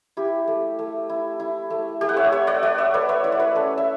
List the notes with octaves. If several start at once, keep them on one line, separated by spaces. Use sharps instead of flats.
E4 G4
A3
A3
E4
E4
A3
A3 G4
F#5
C#5 E5
E4 C#5 E5
D5 F#5
A3 D5 F#5
C#5 E5
A3 B4 D5
C#5 E5
E4 D5
C#5
B4 D5
C#4 A4 C#5
E5